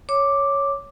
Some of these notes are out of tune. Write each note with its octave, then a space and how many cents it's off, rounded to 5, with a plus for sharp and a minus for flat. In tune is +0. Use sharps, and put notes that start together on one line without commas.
C#5 +0 D6 +0